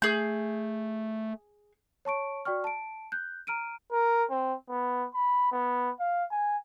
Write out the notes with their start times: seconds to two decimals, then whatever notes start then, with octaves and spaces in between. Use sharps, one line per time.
0.02 A3 G#4 G6
2.05 C#5 A5 C#6 D7
2.45 F#4 D5 G5 C#6 F6
2.64 A5 D7
3.12 F#6 G6
3.47 A#5 F6 D7 D#7
3.92 A#4
4.30 C4
4.70 B3
5.14 B5
5.52 B3
6.00 F5
6.31 G#5